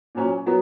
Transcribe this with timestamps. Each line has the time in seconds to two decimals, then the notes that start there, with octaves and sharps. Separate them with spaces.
0.15 A#2 F#3 C#4
0.46 F#3 B3